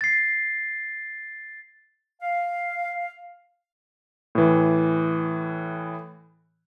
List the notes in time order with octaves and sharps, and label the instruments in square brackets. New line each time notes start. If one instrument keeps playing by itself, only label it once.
[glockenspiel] A6 C7
[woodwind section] F5
[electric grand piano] A2 E3